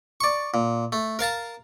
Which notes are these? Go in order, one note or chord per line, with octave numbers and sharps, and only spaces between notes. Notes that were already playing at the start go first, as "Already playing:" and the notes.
D5 C#6
A#2
A3
A#4 F5 A5 A#5